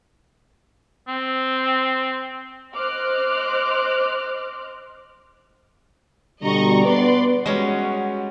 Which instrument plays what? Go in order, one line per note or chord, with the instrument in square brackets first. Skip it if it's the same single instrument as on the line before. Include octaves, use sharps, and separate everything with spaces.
[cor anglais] C4
[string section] C5 D#5 C6 D6 F6 F#6
[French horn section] B2 D3 G3 [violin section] D#5 A#5 C#6
[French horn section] B3 B4 [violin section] D5 C6
[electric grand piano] G3 C#5 D#5 [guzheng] G#3 C#4 [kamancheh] F#4